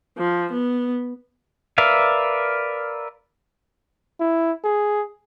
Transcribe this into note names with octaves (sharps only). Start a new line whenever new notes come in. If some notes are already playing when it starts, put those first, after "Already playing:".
F3
B3
A#4 B4 D5 E5 F5
E4
G#4